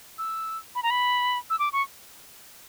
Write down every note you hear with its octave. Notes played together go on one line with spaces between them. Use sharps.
E6
B5
A#5
B5
E6
D6
C#6